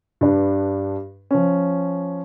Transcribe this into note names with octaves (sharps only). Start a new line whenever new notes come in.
G2 D4 B4
F3 C#4